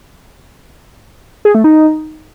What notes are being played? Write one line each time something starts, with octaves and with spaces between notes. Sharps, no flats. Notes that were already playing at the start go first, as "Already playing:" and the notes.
G#4
A3
D#4